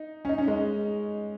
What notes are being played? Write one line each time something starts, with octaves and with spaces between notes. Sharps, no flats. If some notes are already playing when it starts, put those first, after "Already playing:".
Already playing: D#4
C#4
D#4
C#4
G#3